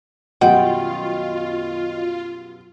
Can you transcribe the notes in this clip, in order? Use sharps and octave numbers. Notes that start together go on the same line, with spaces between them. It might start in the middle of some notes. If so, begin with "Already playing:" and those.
F#2 B2 D#3 G3 F4 F#5 G5